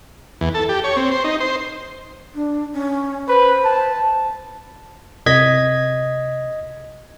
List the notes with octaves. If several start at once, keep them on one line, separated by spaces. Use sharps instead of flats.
E2
A4
G4
C#5
C4
C5
D#4
C5
D4
C#4
B4 C5
A5
C3 D#5 G#6 B6